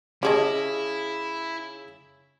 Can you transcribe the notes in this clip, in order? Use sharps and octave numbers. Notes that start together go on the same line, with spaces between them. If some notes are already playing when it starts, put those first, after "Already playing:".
C#3 C#4 E4 G4 G#4 D#5 A5